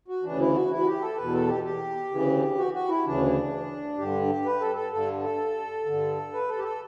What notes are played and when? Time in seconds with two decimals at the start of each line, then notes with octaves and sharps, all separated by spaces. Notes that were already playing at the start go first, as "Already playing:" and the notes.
0.08 F#4
0.23 D2 C#3 E3 D4
0.40 E4
0.55 F#4
0.71 E4
0.79 F#4
0.86 G4
1.01 A4
1.17 E2 B2 B4
1.34 A4
1.48 G4
1.64 G4
2.11 D2 C#3 E3
2.58 F#4
2.73 F#4
2.89 E4
3.05 D2 C#3 E3 D4
3.98 G2 D3 G4
4.46 B4
4.61 A4
4.76 A4
4.92 G2 D3 A4
5.24 A4
5.86 G2 D3
6.33 B4
6.49 A4
6.58 G4
6.64 A4